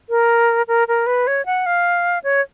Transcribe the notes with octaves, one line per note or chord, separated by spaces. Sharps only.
A#4
A#4
A#4
B4
C#5
F#5
F5
C#5